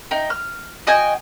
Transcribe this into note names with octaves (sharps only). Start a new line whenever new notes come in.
D#4 G5
F6
F#4 D#5 G5 G#5